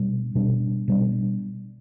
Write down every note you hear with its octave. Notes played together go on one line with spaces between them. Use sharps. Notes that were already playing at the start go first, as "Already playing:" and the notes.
Already playing: B2 G3 D4
B2 G3 D4
B2 G3 D4